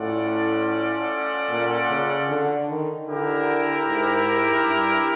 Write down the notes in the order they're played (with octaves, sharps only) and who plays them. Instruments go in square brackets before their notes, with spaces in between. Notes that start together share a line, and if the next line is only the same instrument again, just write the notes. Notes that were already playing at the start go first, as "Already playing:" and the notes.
Already playing: [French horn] A2 [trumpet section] C#4 F4 A4 D5 F#5
[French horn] A#2
C#3
D3
D#3
[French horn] D3 [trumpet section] E4 G4 A#4
[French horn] G#2
G2